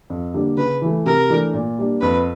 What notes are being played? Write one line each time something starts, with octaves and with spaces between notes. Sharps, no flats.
F2
D3 G3 A#3 D4
C#3 B4
E3 A3
C3 A#4
E3 A3 D4
A#2
G3 A#3 D4
F2 B4